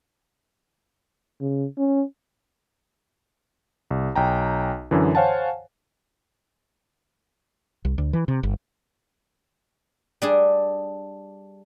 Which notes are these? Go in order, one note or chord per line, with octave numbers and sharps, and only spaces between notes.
C#3
C#4
C2
B1 G5 A#5
F#2 D3 E3
C5 C#5 F5 F#5 G#5 A5
C2
D2
E3
C3
G1
G3 D4 G#4